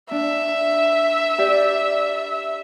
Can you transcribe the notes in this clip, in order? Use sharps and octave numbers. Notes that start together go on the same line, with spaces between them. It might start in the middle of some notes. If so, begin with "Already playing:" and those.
D4 E5
G4 D5